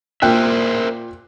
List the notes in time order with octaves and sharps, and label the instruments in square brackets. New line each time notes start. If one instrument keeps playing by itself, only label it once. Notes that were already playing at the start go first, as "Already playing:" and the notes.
[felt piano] A#2 G5 F#6 [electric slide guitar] A#4 C5 E5